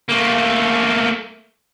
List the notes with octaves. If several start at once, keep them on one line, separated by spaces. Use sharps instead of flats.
A3 A#3